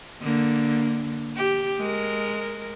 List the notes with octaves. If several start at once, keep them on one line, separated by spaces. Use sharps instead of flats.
D3 A#3
G4
G#3 A#4